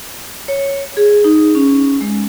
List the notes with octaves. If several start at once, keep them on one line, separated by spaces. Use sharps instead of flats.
C#5
G#4
D#4
C#4
G#3